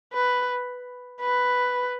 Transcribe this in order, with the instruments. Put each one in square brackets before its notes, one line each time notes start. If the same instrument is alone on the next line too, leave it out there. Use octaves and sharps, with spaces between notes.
[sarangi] B4
B4